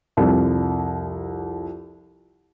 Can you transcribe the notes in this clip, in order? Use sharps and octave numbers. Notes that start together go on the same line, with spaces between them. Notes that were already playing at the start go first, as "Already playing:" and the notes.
C2 F2